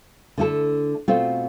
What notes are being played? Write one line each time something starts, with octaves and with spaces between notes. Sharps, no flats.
D3 A3 E4 A4
B2 A3 C4 F4